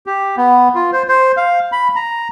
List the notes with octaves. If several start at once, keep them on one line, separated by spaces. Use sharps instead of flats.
G4
B3
F4
C5
C5
F5
B5
A#5